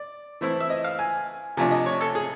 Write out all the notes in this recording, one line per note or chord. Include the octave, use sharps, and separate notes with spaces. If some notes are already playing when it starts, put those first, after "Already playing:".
Already playing: D5
E3 A3 C4 E4
E5
D#5
F5
G#5
C3 F3 A3 D4 G#5
D#5
C#5
A4
G#4